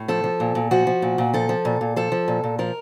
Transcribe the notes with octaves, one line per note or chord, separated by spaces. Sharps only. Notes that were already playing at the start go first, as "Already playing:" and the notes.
Already playing: A2
F3 A4
F3
A#2
A#2
F3 F#4
F3
A#2
A#2
F3 A4
F3
A#2
A#2
F3 A4
F3
A#2
A#2
F3 A#4